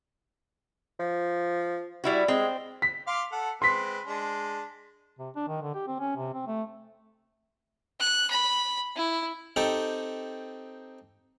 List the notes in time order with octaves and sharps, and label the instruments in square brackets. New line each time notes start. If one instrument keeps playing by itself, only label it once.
[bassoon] F3
[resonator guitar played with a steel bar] G3 E4 F#4
[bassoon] G#3 [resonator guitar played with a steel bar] C4
[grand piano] B6
[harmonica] F5 C6 D6
A4 F#5
[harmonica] G#3 C4 B4 [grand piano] C6 B6
[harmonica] G#3 D4
[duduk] C3
D4
D#3
D3
G4
C4
C#4
C3
C4
A3
[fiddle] F#6
B5
E4
[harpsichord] C4 D#4 G4 A4